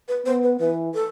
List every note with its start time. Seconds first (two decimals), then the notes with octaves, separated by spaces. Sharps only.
0.08 B4
0.26 B3 C5
0.43 B4
0.60 E3 B4
0.94 A4